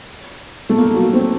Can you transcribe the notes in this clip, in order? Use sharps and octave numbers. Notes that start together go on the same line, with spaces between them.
A3
A#3
F#3
C4